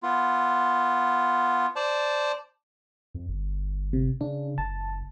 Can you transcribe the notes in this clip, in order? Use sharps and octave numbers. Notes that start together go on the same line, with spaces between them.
B3 F4
C5 D5 A5
F2
G1
C3
C#3 D4
F#1 A5